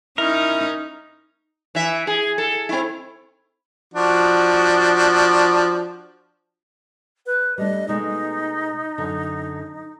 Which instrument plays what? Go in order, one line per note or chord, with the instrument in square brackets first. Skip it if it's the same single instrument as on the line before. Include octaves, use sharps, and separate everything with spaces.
[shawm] C#4 [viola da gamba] D#4 [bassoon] E4 [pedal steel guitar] A#4
[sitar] E3 E5
G#4
A4
C4 E4
[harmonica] F3 D4 F#4
[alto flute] B4
[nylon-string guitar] G3 A3 D4 [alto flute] D#5
[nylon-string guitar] B2 G#3 A3 [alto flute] D#4
[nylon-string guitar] F#2 D3